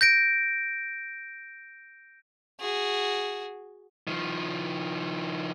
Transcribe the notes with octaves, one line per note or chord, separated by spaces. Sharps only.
G6 A#6 D7
F#4 G#4
D#3 F3